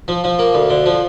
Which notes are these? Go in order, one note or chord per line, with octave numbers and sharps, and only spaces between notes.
F3
F3
A#3
D2
D3
F3